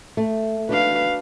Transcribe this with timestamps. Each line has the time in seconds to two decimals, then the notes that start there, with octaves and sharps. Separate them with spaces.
0.17 A3
0.69 D4 F#4 B4 F5